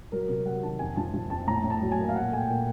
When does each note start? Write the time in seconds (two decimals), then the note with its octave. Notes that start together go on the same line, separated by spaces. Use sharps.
0.12 F#3 A#4
0.29 C3
0.45 F#3 F#5
0.62 D#3 A5
0.79 F2 G#5
0.97 F3 A5
1.14 F3
1.30 F2 A5
1.47 A2 A#5
1.64 A2
1.70 A5
1.81 F#3
1.91 G#5
1.98 A#3
2.09 F5
2.14 A#2 F#5
2.31 A3 G#5
2.37 G5
2.48 A#2